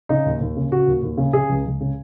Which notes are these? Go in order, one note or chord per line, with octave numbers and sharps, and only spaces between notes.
C#3 D#4
D#2
D#2
C#3
C#3 F#4
D#2
D#2
C#3
C#3 G#4
C#2
C#2
C#3